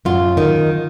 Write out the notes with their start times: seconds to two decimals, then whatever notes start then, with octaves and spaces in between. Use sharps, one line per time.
0.05 F#2 F4
0.37 D#3